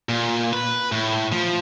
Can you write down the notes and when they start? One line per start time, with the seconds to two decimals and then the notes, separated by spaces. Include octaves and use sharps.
0.09 A#2
0.53 B4
0.92 A2
1.32 F3